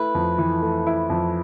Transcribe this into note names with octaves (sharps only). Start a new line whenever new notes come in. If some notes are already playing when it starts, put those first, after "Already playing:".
Already playing: A3 E4 B4
F2
E3
A3
E4
F2